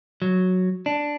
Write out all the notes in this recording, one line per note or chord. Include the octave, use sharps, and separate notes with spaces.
F#3
D4